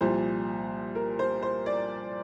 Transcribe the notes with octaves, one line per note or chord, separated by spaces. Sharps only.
C2 A#2 F3 C5
A#4
C5
C5
D5